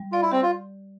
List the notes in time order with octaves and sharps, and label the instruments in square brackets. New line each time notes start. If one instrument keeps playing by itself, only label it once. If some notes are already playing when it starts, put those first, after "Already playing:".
Already playing: [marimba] G3
[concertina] F4 [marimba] D5
[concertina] E4
[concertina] C4 [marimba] G4
[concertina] F4